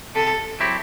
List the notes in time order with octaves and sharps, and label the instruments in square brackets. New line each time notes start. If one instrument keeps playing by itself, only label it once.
[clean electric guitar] C3 [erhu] A4
[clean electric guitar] F#3 C4 E4 G4